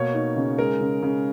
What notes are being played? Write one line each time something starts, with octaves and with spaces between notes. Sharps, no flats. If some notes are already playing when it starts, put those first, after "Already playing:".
Already playing: B2 A#3 C#5
D#4
C#3
G#3 A#4
C#3
C#3